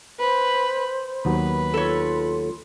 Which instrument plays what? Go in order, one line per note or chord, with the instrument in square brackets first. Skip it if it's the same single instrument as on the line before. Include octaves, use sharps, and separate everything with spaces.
[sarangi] B4 [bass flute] C5
[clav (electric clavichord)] D#2 F#3 B3 [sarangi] B4
[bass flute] F4 [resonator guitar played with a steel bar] A4 C#5